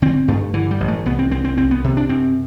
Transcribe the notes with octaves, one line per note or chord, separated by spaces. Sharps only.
D3 C4
G2 A3
D3 E3
G3
A1
A3
C2 B3
C4
C2 C4
C4
C2 C4
B3
C3
D4
F#2 C4